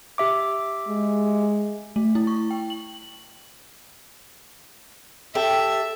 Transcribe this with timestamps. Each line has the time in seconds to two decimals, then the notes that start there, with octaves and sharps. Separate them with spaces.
0.18 G4 E5 D6
0.88 G#3
1.96 A3
2.15 E4
2.27 C#6
2.51 G5
2.70 F#7
5.35 G4 A4 E5